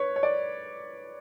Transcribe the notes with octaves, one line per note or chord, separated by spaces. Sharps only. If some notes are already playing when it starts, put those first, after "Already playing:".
Already playing: B4 C#5
C#5
D5